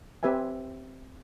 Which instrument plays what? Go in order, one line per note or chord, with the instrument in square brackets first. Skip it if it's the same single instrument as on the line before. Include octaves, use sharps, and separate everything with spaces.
[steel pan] C4 G4 B4 E5 G#5